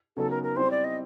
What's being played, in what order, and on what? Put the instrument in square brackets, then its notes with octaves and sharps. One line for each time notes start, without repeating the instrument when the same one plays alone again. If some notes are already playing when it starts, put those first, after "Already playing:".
[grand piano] C#3 F#3 B3 D#4 [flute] A4
[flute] A#4
A#4
[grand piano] G3 C4 E4 G4 [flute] C5
[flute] D5
D#5